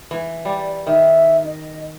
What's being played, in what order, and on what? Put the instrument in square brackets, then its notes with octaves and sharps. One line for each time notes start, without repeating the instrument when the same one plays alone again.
[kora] E3
[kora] G3 [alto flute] D5
[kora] D#3 [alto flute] E5
[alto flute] D#5